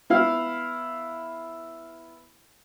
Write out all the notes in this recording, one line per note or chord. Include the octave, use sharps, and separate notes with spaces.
B3 E4 F5